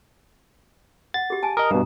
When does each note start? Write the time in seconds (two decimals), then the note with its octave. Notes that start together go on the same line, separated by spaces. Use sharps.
1.14 F#5 A6
1.30 G4 G#4
1.43 G#5 A5
1.57 A#4 D#5 D#6
1.71 G2 B2 A#5